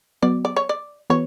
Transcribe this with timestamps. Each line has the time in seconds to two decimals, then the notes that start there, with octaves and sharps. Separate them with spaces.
0.22 F#3 B3 F#4 D5
0.45 D5
0.56 C#5
0.69 D5
1.10 E3 B3 F#4 B4 C#5